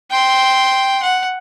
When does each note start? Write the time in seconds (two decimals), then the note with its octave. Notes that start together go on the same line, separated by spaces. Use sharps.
0.11 G5 C6
1.03 F#5